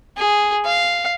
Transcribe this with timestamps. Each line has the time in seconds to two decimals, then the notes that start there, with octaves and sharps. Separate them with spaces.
0.17 G#4
0.65 F5